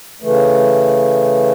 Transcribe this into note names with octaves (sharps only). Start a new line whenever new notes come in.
C#3 E3 A3